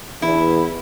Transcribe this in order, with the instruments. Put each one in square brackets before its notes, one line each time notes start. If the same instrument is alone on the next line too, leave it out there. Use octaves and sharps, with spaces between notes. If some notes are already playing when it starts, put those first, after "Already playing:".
[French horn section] E2 [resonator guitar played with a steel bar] E4